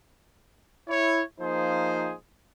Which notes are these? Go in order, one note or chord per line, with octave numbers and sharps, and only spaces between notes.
E4 C#5
F3 A#3 D#4 G#4 C5